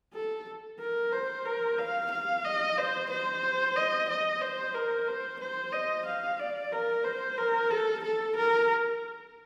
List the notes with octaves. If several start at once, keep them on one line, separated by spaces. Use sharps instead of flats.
A4
A#4
C5
A#4
F5
F5
D#5
C5
C5
D#5
D#5
C5
A#4
C5
C5
D#5
F5
D5
A#4
C5
A#4
A4
A4
A#4